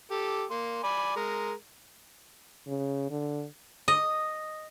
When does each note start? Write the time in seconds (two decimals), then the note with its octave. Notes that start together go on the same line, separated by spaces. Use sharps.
0.11 G4 A4
0.51 A#3 C6
0.83 D5 G#5 B5
1.16 G#3 A#4
2.67 C#3
3.10 D3
3.88 D#5